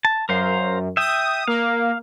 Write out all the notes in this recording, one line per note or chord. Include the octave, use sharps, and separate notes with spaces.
A5
F#2 A#4 C5 F5
E5 G5 D#6
A#3 F5